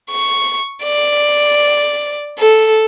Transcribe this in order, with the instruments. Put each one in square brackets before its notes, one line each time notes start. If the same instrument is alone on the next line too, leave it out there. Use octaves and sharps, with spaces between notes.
[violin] C#6
D5
A4